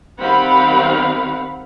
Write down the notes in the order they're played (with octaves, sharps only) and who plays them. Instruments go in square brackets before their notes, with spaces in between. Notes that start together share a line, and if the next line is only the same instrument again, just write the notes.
[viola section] D#3 G3 C4 F5 F#5 B5